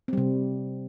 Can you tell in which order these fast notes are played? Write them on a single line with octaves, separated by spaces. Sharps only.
C4 G3 C3